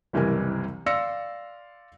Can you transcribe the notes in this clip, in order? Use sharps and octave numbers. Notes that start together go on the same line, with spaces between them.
F#1 C2 E3 G3 A#4 G#5
D5 F5 C6 E6 A#6 C#7